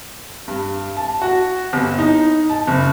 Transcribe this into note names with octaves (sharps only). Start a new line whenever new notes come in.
G2
A5
F#4
G1
D#4
A5
F#1